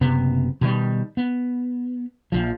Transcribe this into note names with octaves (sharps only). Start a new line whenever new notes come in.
F#1 C3 B3
B2 D#3 F3 G3
B3
A#1 F3